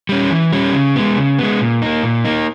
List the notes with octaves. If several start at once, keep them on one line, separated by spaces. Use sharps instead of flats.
G3 C#4
E3
G3 C#4
C#3
G#3 B3
C#3
G#3 B3
A#2
A#3 D#4
A#2
A#3 D#4